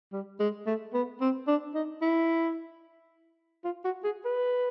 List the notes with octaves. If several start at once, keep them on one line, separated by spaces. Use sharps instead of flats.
G3
G#3
A3
B3
C4
D4
D#4
E4
F4
F#4
G#4
B4